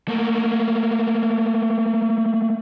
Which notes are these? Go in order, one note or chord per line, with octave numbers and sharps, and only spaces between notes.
A3 A#3